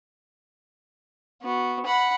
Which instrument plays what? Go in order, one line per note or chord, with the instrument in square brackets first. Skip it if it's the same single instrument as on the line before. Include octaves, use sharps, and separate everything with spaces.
[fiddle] B3 F#4
F#5 B5